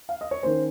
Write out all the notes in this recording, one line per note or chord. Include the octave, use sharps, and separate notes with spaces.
F5
D#5
C#5
D#3 A#3 C#4 C5